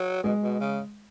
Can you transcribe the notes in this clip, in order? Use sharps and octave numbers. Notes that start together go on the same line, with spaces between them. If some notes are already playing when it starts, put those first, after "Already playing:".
Already playing: F#3
B2 G#3
B2
C#3